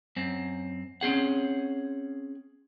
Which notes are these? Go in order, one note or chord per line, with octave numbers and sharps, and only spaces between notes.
F#2 C4
C4 C#4 G#4 F#5